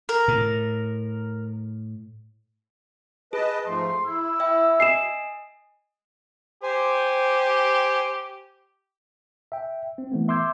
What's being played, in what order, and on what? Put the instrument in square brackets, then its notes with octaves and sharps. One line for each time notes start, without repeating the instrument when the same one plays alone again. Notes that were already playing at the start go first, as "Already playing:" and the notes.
[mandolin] A#4
[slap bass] A2
[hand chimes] G#4 [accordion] B4 D#5 A5
[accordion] G#2 F3 A3 [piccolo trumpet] C6
[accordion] E4 [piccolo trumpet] E6
[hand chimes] E5 G5
[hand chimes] D#5 G#5 D#6 [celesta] C7 E7
[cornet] G4 [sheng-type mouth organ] C5 G#5
[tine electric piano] E5 G5
C4
E3 A3 B3
E5 C6 D6 E6 G6 G#6